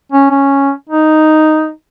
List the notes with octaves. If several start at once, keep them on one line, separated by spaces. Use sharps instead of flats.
C#4
C#4
D#4